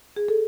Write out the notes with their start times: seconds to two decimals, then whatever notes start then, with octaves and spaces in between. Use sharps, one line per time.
0.16 G#4
0.28 A4